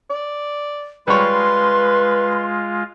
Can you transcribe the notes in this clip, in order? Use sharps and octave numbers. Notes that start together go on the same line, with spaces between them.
D5
G3 G#3 F4 B4 C#5 C6